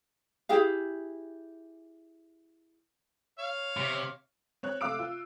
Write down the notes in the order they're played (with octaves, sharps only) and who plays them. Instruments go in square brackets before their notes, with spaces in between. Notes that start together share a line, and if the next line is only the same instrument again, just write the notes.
[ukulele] E4 G4 G#4 F5
[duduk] C#5 [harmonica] F5
[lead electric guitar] C3
[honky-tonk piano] C4 C#5 F#6
C3 A3 F5 D6 E6 D7
F4